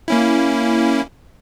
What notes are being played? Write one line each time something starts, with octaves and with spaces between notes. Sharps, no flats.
A#3 C#4 E4